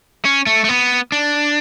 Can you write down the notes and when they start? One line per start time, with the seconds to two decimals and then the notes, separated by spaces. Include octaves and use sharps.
0.25 C#4
0.47 A3
0.65 A3
0.69 B3
1.12 D4